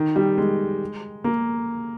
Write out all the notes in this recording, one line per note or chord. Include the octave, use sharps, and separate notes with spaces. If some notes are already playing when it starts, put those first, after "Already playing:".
Already playing: D#3
G3
G#3
A#3